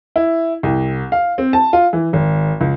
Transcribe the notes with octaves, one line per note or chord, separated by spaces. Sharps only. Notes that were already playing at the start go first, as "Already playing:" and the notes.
E4
C2
F5
C4
A5
F4
E3
G#1
C#2